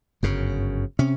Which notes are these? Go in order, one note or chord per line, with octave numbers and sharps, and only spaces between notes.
G1 F#2 C#3
C3 C#4